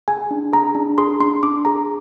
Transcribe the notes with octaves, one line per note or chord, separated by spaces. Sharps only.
G#4 G#5
D4
G#4 A#5
D4
G#4 C6
D4 C6
D4 D6
G#4 A#5